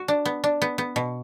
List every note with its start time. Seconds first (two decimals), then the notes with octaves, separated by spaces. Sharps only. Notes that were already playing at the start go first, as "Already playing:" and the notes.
Already playing: F#4
0.08 D4
0.25 B3
0.44 D4
0.62 B3
0.78 B3
0.96 B2